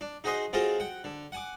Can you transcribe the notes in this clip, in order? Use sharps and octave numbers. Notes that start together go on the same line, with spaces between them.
D4
D#4 F#4 G#4 C5 D#5 C6
F#3 C4 F4 G#4 A4 D#5
F#5 G5
D3
F#5 G#5 D6